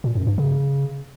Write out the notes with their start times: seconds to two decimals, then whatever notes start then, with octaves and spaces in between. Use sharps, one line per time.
0.04 A#2
0.15 F#2
0.27 G2
0.38 C#3